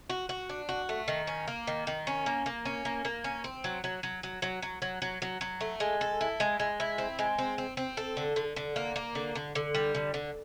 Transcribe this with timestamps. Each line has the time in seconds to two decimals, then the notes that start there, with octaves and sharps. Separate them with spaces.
0.10 F#4
0.29 F#4
0.49 D4
0.69 F#4
0.89 A3
1.08 D#3
1.27 C#4
1.48 A#3
1.67 D#3
1.87 D#3
2.07 C#4
2.26 A#3
2.46 A#3
2.65 C#4
2.85 A#3
3.05 A#3
3.24 C#4
3.44 C4
3.64 F#3
3.84 F#3
4.03 F#3
4.23 F#3
4.42 F#3
4.62 F#3
4.82 F#3
5.02 F#3
5.22 F#3
5.41 F#3
5.61 A3
5.80 G#3
6.01 A4
6.21 E4
6.40 G#3
6.60 G#3
6.80 E4
6.98 C4
7.19 G#3
7.39 C4
7.58 C4
7.77 C4
7.97 A4
8.17 D3
8.36 D3
8.56 D3
8.76 A#3
8.96 A#3
9.15 D3
9.35 D3
9.55 D3
9.75 G3
9.95 D3
10.14 D3